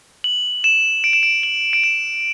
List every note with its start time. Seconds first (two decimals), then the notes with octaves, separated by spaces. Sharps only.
0.24 F#7
0.64 E7
1.04 D7
1.13 E7
1.23 D7
1.43 F#7
1.73 D7
1.84 E7